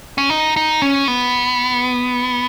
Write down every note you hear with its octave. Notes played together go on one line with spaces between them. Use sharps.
C#4
D#4
D#4
C#4
B3